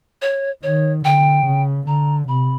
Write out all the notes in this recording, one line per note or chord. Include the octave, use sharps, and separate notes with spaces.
C#5
D#3 C#5
D3 G5
C#3
D3 A#5
C3 B5